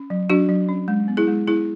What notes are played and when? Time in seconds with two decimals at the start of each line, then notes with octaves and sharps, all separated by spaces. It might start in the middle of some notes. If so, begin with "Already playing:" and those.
Already playing: C#4
0.10 F#3
0.30 F#3 D4 F#4
0.49 F#3
0.69 C#4
0.88 G#3
1.08 B3
1.17 E4 G#4
1.28 G#3
1.48 B3 E4 G#4